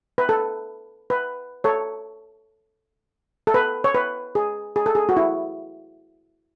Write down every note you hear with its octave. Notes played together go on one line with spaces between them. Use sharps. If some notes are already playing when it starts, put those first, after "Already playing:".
B4
A4
B4
A4 C#5
A4
B4
C#5
B4
G#4
G#4
A4
G#4
F#4
E4